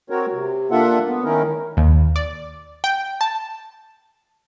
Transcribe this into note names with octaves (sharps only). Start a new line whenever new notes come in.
C4 F#4 A#4 C#5
C3
A#3 D4 F4 A4 E5 F#5
B3
D#3 C#4 D#4 E4 A#4
D#2
D5
G5
A5